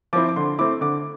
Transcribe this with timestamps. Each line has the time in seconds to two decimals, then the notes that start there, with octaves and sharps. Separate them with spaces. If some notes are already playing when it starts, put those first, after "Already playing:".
0.13 F3 C4 E4 D6
0.29 D6
0.36 D3 C6
0.59 A3 C4 E4 D6
0.81 D3 D6